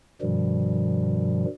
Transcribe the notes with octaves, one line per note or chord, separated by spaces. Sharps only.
G2 B2 D#3 F3 G3